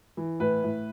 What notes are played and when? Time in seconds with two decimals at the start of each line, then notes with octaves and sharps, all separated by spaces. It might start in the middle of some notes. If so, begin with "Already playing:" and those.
0.17 E3
0.40 A2 B4
0.64 A2